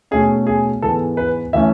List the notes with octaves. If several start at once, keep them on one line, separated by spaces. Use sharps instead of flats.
B2 A3 C#4 G#4
G#4
G#2 E3 G#3 B3 A4
B4
E3 A3 C#4 E5